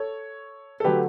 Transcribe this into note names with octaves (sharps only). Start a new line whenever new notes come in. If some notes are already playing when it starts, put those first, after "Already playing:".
Already playing: A4 C#5
A4
D3 F#3 A3 G4 B4